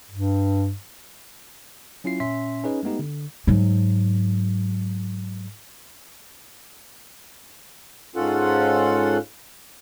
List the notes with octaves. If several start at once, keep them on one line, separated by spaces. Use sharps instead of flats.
G2
F#3 C#4 E4 F4 C7
A#2 C#4 E5 C6 B6
C#4 D#4 G#4 B4 D#5
G#3 A3 B3 D#4 G4
D3
G#2 F#3
G#2 C#4 F4 A4 F#5